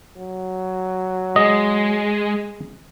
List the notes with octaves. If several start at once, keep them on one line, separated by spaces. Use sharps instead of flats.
F#3
G#3 G#4 D#5